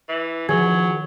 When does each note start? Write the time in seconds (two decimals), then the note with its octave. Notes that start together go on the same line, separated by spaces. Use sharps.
0.09 E3
0.49 D#3 F3 F#3 G#4 G#6